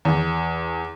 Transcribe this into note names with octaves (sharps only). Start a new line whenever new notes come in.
E2